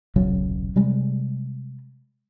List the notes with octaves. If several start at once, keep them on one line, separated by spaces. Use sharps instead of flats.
D#1 B1 C#3 F#3
C3 G3 G#3